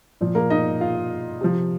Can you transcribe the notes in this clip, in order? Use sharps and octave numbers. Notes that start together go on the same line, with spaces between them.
A#2 F3
A#3 A#4
D#4 D#5
F4 F5
C3 F3